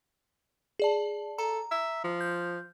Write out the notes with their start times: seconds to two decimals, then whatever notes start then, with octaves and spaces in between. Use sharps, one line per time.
0.79 G#4 D5 A5
1.38 A4 A#5
1.71 E5
2.04 F3
2.21 G6